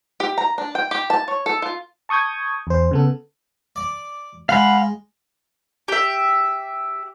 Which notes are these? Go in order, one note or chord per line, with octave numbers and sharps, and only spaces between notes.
G4
A#5
D4
G5
G4
A5
C#5
A4
F4
A5 C#6 D#6 G6 G#6
E2 C5
C#3 B3 A4
D5
G#3 F5 F#5 B5
G4 E5